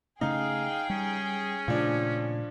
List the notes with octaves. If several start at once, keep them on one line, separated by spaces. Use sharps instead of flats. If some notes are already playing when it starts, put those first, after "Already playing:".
C#3 A3 C#4 D#4 G#4 F5 G5
G3 C#4
A#2 C#3 F3 A3 D4